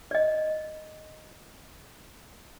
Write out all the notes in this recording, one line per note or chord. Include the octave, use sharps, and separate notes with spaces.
D5 D#5